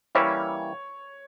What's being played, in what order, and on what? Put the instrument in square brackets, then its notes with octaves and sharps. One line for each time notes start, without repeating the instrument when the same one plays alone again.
[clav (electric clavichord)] E3 G3 A#3 C#4 E4 [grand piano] C#5